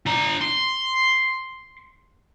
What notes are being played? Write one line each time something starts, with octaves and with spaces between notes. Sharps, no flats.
D4 A#5
C6